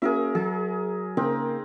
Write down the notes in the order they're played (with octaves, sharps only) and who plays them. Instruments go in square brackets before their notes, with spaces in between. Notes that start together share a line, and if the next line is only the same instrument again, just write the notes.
[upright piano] A#3 C#4 F#4 [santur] G#4 A#4 E5
[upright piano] F#3 [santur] G#4
[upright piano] C#3 A#3 [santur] C4 D#4 A#4